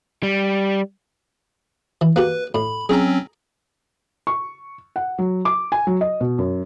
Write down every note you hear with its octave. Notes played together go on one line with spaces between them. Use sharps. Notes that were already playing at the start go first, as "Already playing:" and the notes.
G3
E3
A#3 F#4 G4 B4
A2 B5
F#3 C4 C#4 G#4 A#5
C#6
F#5
F#3
D6
G#5
F#3
D#5
B2
F#2